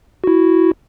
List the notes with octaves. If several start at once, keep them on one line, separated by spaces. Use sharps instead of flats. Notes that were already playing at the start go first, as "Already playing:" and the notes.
E4 F#4